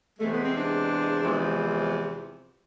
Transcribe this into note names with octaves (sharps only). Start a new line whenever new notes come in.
E2 C3 G#3 A3
B3
C4
D4
E2 C3 F3 G#3